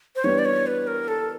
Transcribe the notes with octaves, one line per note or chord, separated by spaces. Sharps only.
C5
E3 G3 B3 D4 C#5
D5
C#5
B4
A#4
A4